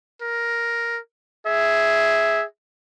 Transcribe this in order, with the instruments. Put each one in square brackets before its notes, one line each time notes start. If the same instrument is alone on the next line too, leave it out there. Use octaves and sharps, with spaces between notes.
[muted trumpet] A#4
[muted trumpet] G#4 [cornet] E5